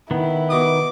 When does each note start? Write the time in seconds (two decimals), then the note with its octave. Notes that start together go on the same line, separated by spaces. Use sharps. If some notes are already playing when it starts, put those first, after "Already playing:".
0.11 D#3 B3 E4
0.50 B2 D6 D#6